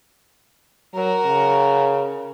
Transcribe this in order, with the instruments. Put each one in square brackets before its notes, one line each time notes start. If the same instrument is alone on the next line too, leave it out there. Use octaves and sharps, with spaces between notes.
[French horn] F#3 [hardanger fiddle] F#4 A#4
[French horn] C#3